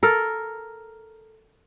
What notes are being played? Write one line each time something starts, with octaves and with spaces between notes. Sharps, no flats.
A4 A#4